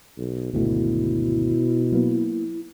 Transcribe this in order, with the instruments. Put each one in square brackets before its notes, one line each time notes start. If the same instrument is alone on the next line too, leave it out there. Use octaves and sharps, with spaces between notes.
[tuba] B1
[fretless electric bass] G#1 D2 A3 [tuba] B2 [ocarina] E4
[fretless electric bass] F#3 A#3 B3